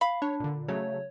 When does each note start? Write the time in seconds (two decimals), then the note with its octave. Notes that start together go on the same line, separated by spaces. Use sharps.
0.01 F5 B5
0.22 D4 C#5
0.40 A#2 D3
0.68 C#3 F#3 A3 C#5